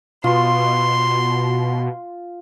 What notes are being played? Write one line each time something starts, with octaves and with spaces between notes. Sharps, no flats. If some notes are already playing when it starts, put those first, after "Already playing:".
B2 F4 C6